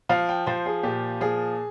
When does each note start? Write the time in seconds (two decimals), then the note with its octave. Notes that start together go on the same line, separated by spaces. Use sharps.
0.09 F3 F5
0.29 G5
0.47 F3 C5
0.66 G#4
0.83 A#2 G4
1.21 F3 G#4